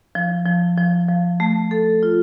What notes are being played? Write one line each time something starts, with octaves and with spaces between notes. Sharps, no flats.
F3
F3
F3
F3
A3
A4
F4